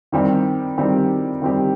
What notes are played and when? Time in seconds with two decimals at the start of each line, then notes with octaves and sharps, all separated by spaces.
0.12 D#3 G3 C4 G4
0.78 D#3 G3 C4 G4
1.42 D#3 G3 C4 G4